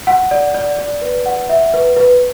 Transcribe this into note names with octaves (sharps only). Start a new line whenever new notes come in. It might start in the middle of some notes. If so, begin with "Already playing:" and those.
F#5
D5
D5
D5
B4
F#5
E5
B4
B4